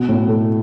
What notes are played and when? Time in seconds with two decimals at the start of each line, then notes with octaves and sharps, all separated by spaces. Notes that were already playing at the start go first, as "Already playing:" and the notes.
Already playing: B2
0.09 A2
0.29 A3